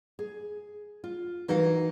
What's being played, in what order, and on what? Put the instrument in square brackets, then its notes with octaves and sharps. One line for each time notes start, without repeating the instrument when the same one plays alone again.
[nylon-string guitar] G#4
F4
E3 D#4 F#4 A#4 F5